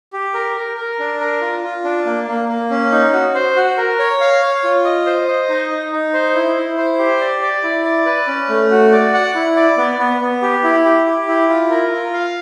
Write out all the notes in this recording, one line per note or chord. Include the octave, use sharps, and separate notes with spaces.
G4
A#4
A#4
A#4
D4
A#4
F4
F4
D4
A#3
A#3
A#3
C#4
D#4
F#4
C5
F#4
A#4
C#5
F5
C#5
F4
D#5
C5
D#5
D#4
D#4
D#4
C5
E4
E4
C5
G4
D5
D5
E4
D5
B4
C#4
A3
F#4
D5
F#5
E4
D5
B3
B3
B3
G4
E4
G4
G4
E4
F4
A#4
F4
F5